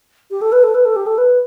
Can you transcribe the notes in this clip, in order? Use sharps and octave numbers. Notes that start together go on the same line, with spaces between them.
G4
A4
B4
A4
B4
A4
G4
A4
B4